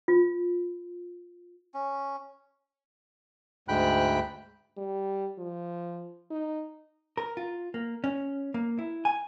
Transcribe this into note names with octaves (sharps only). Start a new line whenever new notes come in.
F4
C#4
D2 G#2 G5 B5 F#6
G3
F3
D#4
A#4
F4
A#3
C#4
A#3
E4
G#5